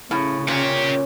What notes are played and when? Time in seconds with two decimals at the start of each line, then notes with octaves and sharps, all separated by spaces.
0.11 A2 C#3
0.48 A#2 C4 C#4 G4